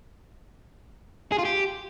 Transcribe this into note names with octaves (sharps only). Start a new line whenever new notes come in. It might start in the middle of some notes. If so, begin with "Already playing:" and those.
G#4
F4
G4